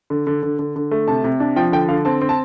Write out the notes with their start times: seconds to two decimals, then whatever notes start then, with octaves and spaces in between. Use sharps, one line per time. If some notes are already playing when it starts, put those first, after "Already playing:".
0.10 D3
0.27 D3
0.43 D3
0.59 D3
0.76 D3
0.91 A3
1.08 C3 A5
1.24 C3
1.40 D4
1.56 F3 G5
1.72 D3 G5
1.88 D3 F5
2.05 C4 A5
2.22 C4
2.29 A5